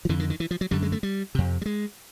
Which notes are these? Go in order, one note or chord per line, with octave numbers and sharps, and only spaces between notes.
F3
F2 D3 E3
D#3
D#3
E3
F3
F#3
F#2 D3 G3
G#3
A3
G3
F2 C3
G3
G#3